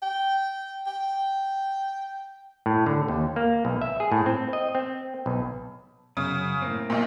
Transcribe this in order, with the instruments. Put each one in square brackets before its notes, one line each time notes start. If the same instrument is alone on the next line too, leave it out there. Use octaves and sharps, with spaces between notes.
[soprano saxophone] G5
G5
[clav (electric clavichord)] A2
D3
D#2
A#3
B1
E5
G#4
A2
C4
D#5
C4
B1
[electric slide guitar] F#2 [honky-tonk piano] C#3
[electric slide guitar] A2 A#3 C4
[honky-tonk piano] B1 A#2